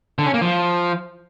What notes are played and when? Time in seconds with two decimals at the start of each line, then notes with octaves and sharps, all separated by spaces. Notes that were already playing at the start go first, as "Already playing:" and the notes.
0.19 D3
0.26 C#4
0.34 A#3
0.42 F3